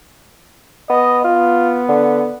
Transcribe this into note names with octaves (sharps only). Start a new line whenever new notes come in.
B3 D#5
B3 F4
D3